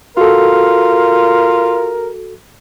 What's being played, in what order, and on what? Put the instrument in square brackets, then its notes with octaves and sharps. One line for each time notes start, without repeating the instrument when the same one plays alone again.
[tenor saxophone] F4 [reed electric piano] F#4 A4 [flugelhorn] A#4